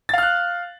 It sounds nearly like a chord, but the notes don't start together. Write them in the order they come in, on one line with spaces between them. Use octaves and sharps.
A6 F5 F6 F#6